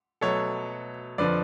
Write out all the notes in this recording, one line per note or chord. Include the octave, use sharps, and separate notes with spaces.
B2 F#3 A3 A4 C#5
F2 D3 F3 B4 D5